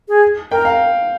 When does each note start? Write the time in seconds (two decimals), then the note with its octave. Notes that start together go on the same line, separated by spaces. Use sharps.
0.09 G#4
0.51 A#4 G5
0.65 F5